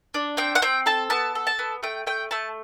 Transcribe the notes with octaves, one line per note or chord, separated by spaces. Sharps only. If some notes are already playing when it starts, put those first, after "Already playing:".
D4
C4 G5
F#5
C4 G5
A4 A5
B3 A5
A4
A5
B3
A3 G5
A3 G5
A3 A5